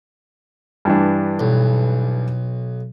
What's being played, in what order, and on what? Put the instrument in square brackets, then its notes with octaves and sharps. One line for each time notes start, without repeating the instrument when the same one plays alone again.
[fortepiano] G2 E3 D4
[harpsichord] B1